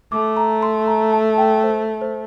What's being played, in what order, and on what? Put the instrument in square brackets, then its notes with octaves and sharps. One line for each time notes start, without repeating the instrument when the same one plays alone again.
[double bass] A3 [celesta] D6
[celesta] A#5
C6
A#5
A5
G5
C5
C5